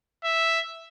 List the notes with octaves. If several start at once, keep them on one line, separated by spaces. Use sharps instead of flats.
E5